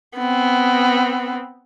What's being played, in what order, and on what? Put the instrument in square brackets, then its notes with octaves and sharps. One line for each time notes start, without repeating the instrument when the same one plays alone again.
[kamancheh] B3 C4